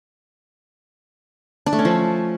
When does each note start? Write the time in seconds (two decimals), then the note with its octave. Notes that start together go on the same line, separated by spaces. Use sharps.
1.66 D4
1.73 A3
1.79 C#4
1.85 F3